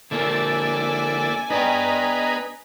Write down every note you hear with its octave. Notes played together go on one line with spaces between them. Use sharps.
D3 A#3 D4 E4 A4 G#5
B3 D4 G#4 B4 D5 D#5 G5 A#5